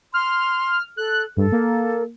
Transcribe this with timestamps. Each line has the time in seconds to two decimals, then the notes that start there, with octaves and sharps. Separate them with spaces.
0.14 C6 F6
0.97 A4 F#6
1.37 G2 A4
1.52 A#3